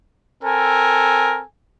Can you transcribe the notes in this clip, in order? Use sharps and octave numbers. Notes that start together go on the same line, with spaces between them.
C4 A4 A#4 G#5